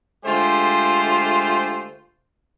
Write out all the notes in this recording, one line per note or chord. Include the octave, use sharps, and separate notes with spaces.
D3 G#3 A3 F4 G4 C5